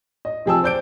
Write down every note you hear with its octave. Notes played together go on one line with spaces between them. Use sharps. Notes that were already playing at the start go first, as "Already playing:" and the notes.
D#5
C3 F3 G#4 G5 A5 E6
C5 D5 G6 D7